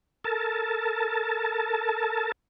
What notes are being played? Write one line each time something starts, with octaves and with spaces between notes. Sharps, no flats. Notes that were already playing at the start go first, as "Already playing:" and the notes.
A4 A#4 A5